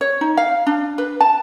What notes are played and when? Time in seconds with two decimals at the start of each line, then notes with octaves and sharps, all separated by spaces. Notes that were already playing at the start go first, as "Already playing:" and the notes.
0.01 C#5
0.21 D#4
0.37 F5
0.67 D4
0.98 B4
1.21 A5